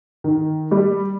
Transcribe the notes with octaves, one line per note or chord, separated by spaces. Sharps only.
D#3
G3